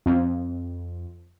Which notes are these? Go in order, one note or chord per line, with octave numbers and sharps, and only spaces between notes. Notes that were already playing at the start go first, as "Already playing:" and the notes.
F2